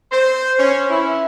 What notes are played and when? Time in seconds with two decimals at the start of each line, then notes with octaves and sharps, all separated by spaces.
0.11 C5
0.59 C#4
0.90 E4